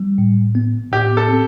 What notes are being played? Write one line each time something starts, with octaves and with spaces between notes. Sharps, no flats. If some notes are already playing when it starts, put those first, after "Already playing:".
Already playing: G3
A2
B3
A2 G4
A4
C4